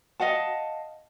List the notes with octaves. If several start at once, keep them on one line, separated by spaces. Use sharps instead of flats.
D#5 F5 F#5 A5